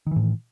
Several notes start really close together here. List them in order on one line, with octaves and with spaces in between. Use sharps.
D#3 E3 A2